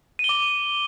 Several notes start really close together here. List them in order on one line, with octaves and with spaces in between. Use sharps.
D#7 G7 D6